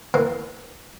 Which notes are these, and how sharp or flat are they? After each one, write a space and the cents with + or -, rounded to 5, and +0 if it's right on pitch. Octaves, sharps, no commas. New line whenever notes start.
E3 -10 A#3 +0